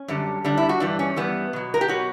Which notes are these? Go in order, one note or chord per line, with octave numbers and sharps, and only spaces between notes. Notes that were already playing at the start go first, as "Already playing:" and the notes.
Already playing: C#4
F#2 D3 G3
F#2 D3 G3 D4
E4
F#4
G2 E3 G3 D4
C#4
G2 E3 G3 B3
B2 F#3
A#4
G4
B2 F#3 F#4